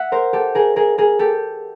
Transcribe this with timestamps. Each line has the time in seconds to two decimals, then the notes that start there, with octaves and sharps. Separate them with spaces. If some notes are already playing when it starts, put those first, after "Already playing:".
Already playing: E5 F#5
0.12 A#4 C5
0.33 G4 A4
0.55 G#4 A#4
0.76 G#4 A#4
0.98 G#4 A#4
1.19 G4 A4